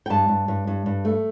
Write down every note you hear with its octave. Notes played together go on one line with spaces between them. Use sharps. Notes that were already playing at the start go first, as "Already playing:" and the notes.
G5
G2 A5
G2
G2
G2
G2
A3